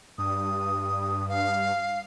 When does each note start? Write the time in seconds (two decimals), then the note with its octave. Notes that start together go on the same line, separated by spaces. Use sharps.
0.18 G2 D#6
1.29 F5